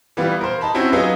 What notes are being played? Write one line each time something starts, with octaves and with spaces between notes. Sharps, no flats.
E3 G3 B3 F4
A#4 C5
D#4 A5 B5
C4 C#4 E4 F#4
F#3 B3 D#4 F4 G#4 D#5